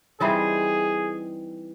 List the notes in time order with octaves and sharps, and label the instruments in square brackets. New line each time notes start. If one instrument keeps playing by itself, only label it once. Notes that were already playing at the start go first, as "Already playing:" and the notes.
[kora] E3 G3 C4 D#4 [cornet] G#4